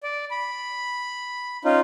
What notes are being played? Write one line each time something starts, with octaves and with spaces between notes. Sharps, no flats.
D5
B5
C#4 D#4 F4